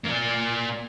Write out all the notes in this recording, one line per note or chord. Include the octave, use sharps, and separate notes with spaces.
A#3 D5